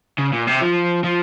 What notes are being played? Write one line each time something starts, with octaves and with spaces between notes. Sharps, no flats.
C#3
A#2
C3
F3
F3